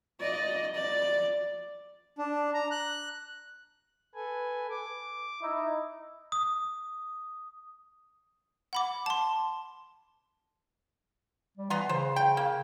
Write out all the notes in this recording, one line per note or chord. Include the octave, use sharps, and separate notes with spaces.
D5 D#5
D5
D4
A#5
F#6
A4 B4 G#5
D6
D#4 E4
D#6
F#5 B5 D6
A5 C6
G3
E3 B3 A#5 C6
C#3 C5
G5
A#3